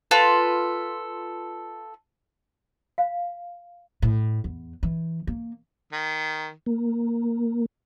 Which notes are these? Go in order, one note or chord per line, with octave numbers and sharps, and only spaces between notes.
F4 A4 B4
F5
A2
E2
E3
A#3
D#3
A#3